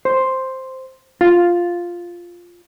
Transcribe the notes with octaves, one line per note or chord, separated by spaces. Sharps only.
C5
F4